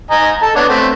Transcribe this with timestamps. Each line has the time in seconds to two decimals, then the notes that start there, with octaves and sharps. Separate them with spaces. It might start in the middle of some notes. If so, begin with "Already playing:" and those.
0.11 D#5 G#5 A#5
0.43 A4 A5
0.56 B3 D4 C#5
0.69 A3 C4